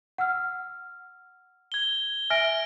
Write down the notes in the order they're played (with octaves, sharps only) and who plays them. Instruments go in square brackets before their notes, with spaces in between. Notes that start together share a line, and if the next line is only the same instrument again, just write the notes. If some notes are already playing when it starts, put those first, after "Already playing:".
[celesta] F#5 E6 F6
[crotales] G#6 G7
[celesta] E5 G#5 [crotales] F6 A#6 D7